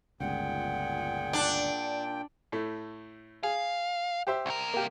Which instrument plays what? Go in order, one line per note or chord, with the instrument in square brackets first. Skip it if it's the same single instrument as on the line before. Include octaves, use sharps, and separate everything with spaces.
[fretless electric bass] G1 C#2 [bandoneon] A#2 G5 [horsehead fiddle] G#4 F#5
[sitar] D4
[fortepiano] A2 A3
[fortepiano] G#4 [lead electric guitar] F5
[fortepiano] G4 C5 E5
[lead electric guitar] C2 A#4
[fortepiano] A#3 G4